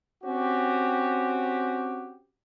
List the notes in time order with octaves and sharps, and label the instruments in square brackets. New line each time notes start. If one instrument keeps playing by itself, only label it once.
[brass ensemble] C4 C#4 F#4 G4